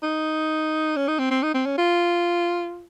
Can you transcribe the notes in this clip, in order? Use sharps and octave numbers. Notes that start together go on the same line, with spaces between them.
D#4
C#4
D#4
C4
C4
D#4
C4
C#4
F4